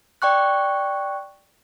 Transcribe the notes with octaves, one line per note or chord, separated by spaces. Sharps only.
D5 G5 C#6 F#6